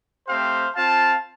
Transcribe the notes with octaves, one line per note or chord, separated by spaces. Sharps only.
A3 C4 G4 C5 F5
C4 F4 F5 A5